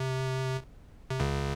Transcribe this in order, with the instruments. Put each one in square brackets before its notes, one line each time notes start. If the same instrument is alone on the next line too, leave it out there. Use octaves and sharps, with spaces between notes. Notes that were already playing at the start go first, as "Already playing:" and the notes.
Already playing: [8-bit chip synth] C3
C3
C#2 C#3